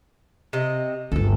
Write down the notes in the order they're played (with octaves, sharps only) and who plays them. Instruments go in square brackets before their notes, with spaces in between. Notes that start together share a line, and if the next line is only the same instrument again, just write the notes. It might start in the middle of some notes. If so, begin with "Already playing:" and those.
[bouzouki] C3 D#5
[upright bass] G1 D2 [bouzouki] A4